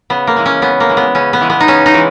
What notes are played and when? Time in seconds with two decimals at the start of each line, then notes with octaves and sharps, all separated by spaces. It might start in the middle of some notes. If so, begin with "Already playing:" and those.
0.10 C#3 B3
0.27 A#3
0.36 E3 G#3
0.46 C#4
0.62 C#3 B3
0.80 A#3
0.89 E3 G#3
0.97 B3
1.15 C#3 C#4
1.33 B3
1.41 E3 G#3
1.50 B3
1.60 D#4
1.68 C#3 C#4
1.86 D#4
1.94 E3 G#3